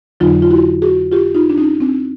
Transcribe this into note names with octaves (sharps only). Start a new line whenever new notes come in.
F2 D3 F#3 D#4 F4
F4
E4 F#4
F#4 G#4
F4 G4
D#4 F4
D4
C#4 D#4
C4 D4